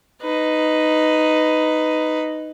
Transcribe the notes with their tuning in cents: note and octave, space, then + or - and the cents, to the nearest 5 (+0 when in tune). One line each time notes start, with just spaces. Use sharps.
D#4 +0 B4 +15